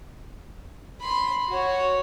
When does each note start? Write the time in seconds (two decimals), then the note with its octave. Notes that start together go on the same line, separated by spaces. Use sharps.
1.01 B5 C6
1.48 F#4 C#5